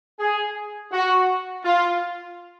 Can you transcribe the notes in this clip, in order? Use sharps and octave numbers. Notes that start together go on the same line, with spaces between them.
G#4
F#4
F4